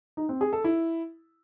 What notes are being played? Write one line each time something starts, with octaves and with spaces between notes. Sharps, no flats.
D#4
C4
G#4
A4
E4